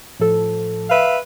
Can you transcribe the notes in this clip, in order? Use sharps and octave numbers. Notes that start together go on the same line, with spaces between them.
A2 F3 A4
B4 E5 F5